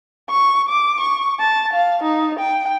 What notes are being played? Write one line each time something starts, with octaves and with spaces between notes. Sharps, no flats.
C#6
D6
C#6
A5
F5
D#4
G5